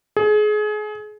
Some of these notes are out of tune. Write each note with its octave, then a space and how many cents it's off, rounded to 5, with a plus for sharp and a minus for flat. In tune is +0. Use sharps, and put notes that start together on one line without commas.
G#4 +30